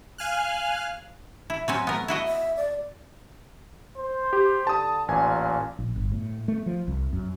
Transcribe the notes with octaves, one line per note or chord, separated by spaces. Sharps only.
F5 G#5 F6 F#6
E4
F#3 C4 C#4
A3 B3 A#4
E4 F#4 D#5
E5
D5
C5
G4
D3 A5 D#6
A1 A#2 G#5
A#1
G1
A2
A3
F3
C2
F#2